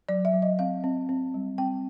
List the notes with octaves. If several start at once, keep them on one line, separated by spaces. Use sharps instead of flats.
F#3 D5
E5
F#3
D#5
C4 F5
C4
C4
G3
C4 G5